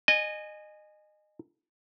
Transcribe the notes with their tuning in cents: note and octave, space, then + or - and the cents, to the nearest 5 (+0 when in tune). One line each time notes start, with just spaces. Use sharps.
D#5 -25 G#5 +0